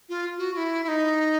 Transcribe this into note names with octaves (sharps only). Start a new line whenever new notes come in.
F4
F#4
F4
E4
E4
D#4